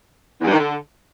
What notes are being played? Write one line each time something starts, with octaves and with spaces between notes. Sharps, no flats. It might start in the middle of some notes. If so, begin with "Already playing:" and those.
E2
G2
D#3
D3